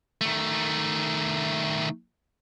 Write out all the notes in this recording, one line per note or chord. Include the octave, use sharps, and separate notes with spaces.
D#3 A3